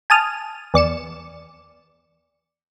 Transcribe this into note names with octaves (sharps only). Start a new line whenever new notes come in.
G#5 A5 D#6 F6
E2 D5 C#7 E7